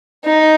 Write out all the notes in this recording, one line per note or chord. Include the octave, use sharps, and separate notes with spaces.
D#4